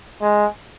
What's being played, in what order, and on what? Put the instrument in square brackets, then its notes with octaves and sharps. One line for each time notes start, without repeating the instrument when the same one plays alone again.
[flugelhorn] G#3